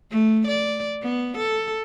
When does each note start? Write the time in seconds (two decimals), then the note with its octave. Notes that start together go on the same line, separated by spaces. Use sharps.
0.11 A3
0.47 D5
1.02 B3
1.37 A4